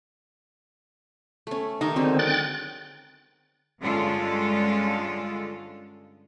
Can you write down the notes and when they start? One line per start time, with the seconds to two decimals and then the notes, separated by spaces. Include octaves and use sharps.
1.47 A3 C#4
1.81 D#3 D#4 G4
1.96 D3 F#3 G#3 C4
2.19 G5 F#6 A6
3.80 G2 D3 G#3 C#4 F4 A4